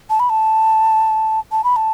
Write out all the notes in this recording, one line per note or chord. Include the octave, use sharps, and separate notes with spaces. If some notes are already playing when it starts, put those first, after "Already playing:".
A5
B5
A5
A5
B5
A5